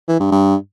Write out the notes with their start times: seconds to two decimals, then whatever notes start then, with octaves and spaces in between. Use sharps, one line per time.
0.08 E3
0.20 G2
0.32 G2